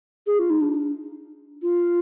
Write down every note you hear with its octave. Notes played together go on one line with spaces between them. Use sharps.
G#4
F4
D#4
D4
F4